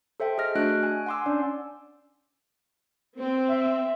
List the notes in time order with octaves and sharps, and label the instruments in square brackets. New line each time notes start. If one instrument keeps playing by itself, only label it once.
[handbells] A4 C5 E5 G5
G#4 D#5 F6 A#6
A3 D4 F#4 D#5 F#6 D7
G#5
F#5 G#5 C6 D6 E6
C#4 D4 D5
[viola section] C4
[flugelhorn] E5